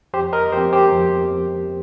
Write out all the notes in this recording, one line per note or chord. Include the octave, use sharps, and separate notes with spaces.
F2 G4 C5
A#4 D#5
F3 C4 G4 C5
G4 C5
F2
F3 C4